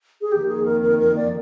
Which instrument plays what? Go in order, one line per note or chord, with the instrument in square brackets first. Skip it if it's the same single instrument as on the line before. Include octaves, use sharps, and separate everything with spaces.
[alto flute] G#4
[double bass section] F2 D#3 A#3 [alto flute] G4
[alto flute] G#4
A#4
A#4
A#4
D5